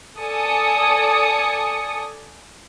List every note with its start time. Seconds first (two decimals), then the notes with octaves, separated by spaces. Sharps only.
0.19 A4 D5 G#5 D#6 C#7